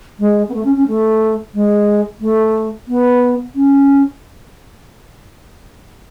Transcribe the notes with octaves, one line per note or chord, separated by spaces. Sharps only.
G#3
B3
A3
C#4
C#4
A3
G#3
A3
B3
C#4